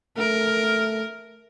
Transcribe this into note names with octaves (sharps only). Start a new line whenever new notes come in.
A3 A#4